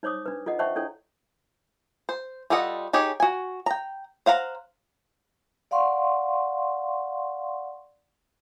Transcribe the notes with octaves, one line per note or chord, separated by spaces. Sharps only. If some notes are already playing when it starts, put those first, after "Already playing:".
D#4 C5 C#5 D6 D#6
D4 B4
F4 A4 D#5 F#5
C5 E5 F#5 G5 A5 C#6
D4 E4 A4 C#5 G5
C5
G3 F4 A4 D#5 F#5
D#4 G4 G#4 C#5
F#4 G#5
G5 A#5
C5 F5 F#5 A#5
D5 F5 F#5 C6 C#6